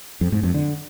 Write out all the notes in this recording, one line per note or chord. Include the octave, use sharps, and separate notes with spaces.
F2
G#2
F2
D3